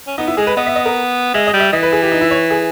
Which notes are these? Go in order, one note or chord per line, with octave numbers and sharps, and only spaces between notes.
C#4
B3 D#4
E4
G#3 G#4
B4
B3 D#5
E5
D#5
A#4
G#3 E5
D#5
G3
E5
E3 D#5
B4
G#4
G4
D#4
E4
C#5
G#4